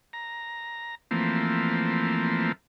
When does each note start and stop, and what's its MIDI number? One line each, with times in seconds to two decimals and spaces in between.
0.13 0.95 82
1.11 2.52 52
1.11 2.52 53
1.11 2.52 57
1.11 2.52 58
1.11 2.52 60